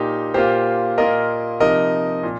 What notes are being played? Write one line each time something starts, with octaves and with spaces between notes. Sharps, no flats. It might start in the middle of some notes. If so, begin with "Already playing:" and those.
Already playing: A#2 A#3 D#4 G4
A#2 A#3 F4 G4 C5
A#2 A#3 F4 A#4 D#5
C3 F3 D#4 A#4 D#5
A#2